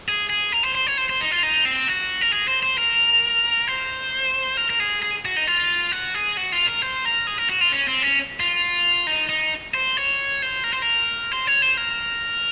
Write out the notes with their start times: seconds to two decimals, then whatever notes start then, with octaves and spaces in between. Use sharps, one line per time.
0.08 G#4
0.30 G#4
0.52 A#4
0.64 C5
0.75 C5
0.87 C#5
0.98 C5
1.10 C5
1.21 D#4
1.31 F4
1.43 D#4
1.65 C4
1.88 F#4
2.21 A#4
2.33 G#4
2.48 C5
2.63 C5
2.78 A#4
3.68 C5
4.57 A#4
4.70 A#4
4.80 G#4
5.02 G#4
5.25 F#4
5.36 D#4
5.47 F4
5.92 F#4
6.15 G#4
6.37 F#4
6.52 F4
6.67 A#4
6.82 C5
7.05 A#4
7.27 G#4
7.38 A#4
7.50 F#4
7.61 F4
7.72 C#4
7.88 C4
8.02 C#4
8.40 F4
9.07 D#4
9.29 D#4
9.74 C5
9.97 C#5
10.42 C5
10.64 A#4
10.73 C5
10.82 A#4
11.32 C5
11.47 C#5
11.62 C5
11.77 A#4